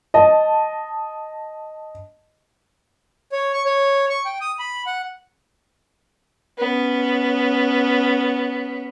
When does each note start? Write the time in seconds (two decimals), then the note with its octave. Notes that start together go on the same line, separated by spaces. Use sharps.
0.14 D#5 A5
3.32 C#5
3.53 C#6
3.65 C#5
4.10 C#6
4.25 G5
4.41 D#6
4.59 B5
4.86 F#5
6.58 B3 C#4